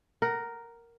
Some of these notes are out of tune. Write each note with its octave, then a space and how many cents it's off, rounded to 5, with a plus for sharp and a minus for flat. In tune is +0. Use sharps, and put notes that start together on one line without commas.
A#4 +0 F#5 +25